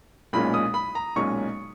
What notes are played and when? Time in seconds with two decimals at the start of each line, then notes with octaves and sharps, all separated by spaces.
0.33 B1 A#2 G#3 C#4 B5
0.54 D#6
0.74 B5
0.95 A#5
1.16 B1 A#2 G#3 C#4 C#6